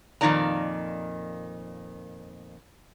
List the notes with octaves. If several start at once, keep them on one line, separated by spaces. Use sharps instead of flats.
F2 A#2 D#3 D#4 D5 A#5